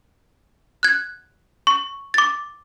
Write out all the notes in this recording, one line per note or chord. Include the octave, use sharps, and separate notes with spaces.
F#6 G#6
C#6
D6 A6